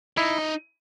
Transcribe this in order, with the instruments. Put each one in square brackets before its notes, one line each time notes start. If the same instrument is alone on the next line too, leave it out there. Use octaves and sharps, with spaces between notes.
[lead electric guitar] D#4 [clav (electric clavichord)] E4